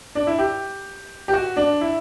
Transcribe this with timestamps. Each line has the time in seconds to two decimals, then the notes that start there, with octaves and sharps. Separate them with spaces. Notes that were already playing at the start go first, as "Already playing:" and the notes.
0.15 D4
0.27 E4
0.39 G4
1.28 G4
1.33 F#4
1.56 D4
1.81 E4